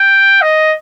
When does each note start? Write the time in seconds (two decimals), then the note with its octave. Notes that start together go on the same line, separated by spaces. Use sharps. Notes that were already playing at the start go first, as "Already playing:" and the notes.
Already playing: G5
0.41 D#5